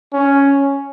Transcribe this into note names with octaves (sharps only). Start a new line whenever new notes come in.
C#4